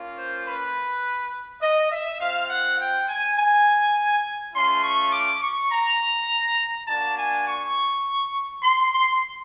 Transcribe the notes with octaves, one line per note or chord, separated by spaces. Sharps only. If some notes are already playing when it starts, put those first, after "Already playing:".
Already playing: A#3 C#4 F4
C5
B4
D#5
E5
C4 F4 F5
F#5
G5
G#5
G#5
A3 C#4 F4 C6
C#6
D6
C#6
A#5
A#3 D4 F#4 A5
G#5
C#6
C6
C6